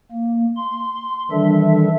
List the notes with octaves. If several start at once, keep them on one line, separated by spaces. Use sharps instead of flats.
A#3
C6
D#3 E3 G3 D4 A4 E5